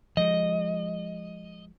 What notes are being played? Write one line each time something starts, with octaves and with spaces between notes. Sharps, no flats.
F3 G#3 D#5